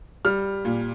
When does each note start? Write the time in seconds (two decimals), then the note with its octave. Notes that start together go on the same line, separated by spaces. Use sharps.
0.25 G3 F6
0.65 A#2